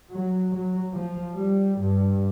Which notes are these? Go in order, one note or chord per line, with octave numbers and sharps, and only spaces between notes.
F#3
F#3
F3
G3
G2